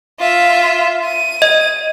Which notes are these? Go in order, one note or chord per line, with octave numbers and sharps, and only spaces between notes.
F4 E5
D#7
D#5